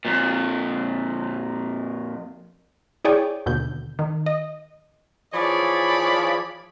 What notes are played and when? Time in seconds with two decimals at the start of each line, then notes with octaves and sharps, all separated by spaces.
0.05 F2 A#2
3.05 E4 G#4 C#5 D5 G5
3.46 D#2 B2 D3 G6
3.99 D#3
4.26 D#5
5.33 E3 F3 G#4 C#5 D5 B5